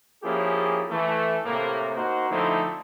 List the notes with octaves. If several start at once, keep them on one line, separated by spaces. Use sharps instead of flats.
F3 A#3 C#4 E4 G4 G#4
E3 A3
A2 C3 A#3
A#3 D#4 F#4 A#4 C5
D3 F3 A3 C4 D#4 E4